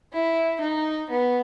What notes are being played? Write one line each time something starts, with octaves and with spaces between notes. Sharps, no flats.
E4
D#4
B3